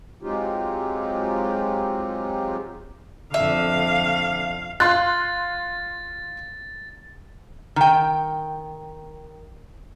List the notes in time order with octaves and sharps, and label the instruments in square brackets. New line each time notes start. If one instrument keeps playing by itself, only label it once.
[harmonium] F#3 G#3 C4 D#4 F4 G4
[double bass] F2 D3 [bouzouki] E5 [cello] F5
[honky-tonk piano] F4 C6 F#6 [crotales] A6
[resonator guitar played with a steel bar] D#3 G5